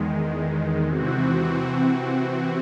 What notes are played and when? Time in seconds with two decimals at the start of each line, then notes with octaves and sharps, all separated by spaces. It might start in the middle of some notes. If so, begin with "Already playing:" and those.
Already playing: E2 D#3 G#3
0.86 C3 E3 C4 F#4